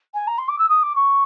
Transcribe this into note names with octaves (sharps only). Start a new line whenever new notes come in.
G#5
A#5
C6
D6
E6
D#6
D6
C#6